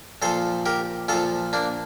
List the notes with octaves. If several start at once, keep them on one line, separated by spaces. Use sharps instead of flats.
A#2 F3 A4 C5
G4 A#4
A#2 F3 F4 A4
A#3 D4